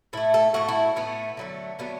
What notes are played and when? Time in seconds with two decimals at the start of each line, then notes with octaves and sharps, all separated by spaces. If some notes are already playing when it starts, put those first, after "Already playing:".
0.13 A2 A3 E4
0.34 A4
0.54 A2 A3 F#4
0.68 E4
0.96 A2 A3 B3
1.37 D3 F#3 A3
1.79 D3 F#3 A3 B3